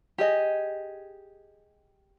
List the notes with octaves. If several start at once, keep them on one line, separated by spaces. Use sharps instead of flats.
G4 G#4 D#5